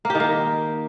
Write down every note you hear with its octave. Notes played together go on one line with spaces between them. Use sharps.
A#3
G4
D#3
A#3